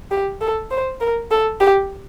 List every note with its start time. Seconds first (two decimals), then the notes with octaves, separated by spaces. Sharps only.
0.11 G4
0.41 A4
0.71 C5
1.00 A#4
1.31 A4
1.61 G4